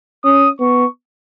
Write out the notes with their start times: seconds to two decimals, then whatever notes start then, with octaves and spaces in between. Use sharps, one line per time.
0.24 C#4 D#6
0.60 B3 C#6